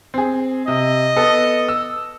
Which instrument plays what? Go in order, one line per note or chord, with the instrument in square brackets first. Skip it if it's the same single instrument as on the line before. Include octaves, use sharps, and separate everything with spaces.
[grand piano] C4 G#4
[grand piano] C3 [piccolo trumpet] D#5
[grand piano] B3 A4
E6